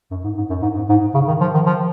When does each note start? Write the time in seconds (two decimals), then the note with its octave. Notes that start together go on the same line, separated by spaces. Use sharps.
0.11 F#2
0.24 G#2
0.37 G#2
0.50 F#2
0.62 G#2
0.76 G#2
0.89 G#2
1.14 C#3
1.28 D#3
1.41 F3
1.54 D#3
1.66 F3